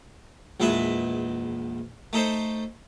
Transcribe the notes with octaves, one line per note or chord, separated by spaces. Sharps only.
A#1 E2 G#3 B4 E5
A3 D#4 A4 C5